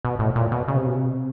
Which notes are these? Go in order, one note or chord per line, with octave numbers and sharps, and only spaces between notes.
B2
A2
A#2
B2
C#3
C3
B2
C3